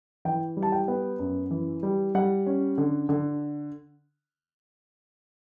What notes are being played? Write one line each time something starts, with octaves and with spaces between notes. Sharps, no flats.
E3 G5
G3
A5
G5
B3
F#2
E3
G3
G3 F#5
C#4
D3
D3